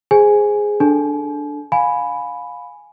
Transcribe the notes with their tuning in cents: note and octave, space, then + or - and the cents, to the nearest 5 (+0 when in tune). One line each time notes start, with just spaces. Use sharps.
G#4 +0 C5 +0 G#5 +0
D4 +0 A4 +0 G#5 +45
F5 +25 G#5 +0 B5 +0